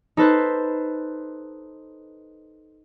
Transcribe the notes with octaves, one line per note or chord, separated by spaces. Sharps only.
D#4 A4 B4 C5